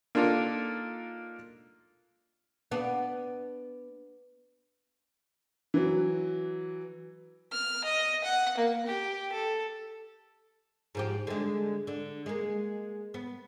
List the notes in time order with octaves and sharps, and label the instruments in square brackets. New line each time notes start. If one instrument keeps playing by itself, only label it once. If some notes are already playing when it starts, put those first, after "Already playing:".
[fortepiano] A#3 D4 D#4 F4 A4 A#4
[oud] B3 D4
[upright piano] E3 F#3
[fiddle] F6
D#5
F#5
A#3
G4
A4
[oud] G#2 F3 G4
D3 G#3
D3
G#3 A#3
B3